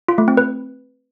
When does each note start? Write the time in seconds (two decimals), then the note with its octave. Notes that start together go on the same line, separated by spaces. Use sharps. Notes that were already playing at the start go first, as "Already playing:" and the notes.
0.08 F4
0.18 A3
0.28 C4
0.37 B4